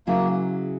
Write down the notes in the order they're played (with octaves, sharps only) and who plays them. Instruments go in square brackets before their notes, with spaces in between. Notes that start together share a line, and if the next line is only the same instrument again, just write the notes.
[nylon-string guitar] C#3 F#3 C#4 E4 G#4 [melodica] A#3